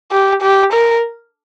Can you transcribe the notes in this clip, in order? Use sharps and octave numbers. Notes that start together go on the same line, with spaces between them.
G4
G4
A#4